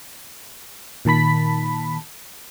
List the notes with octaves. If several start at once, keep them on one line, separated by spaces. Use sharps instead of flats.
A#2 D#3 A5 B5 B6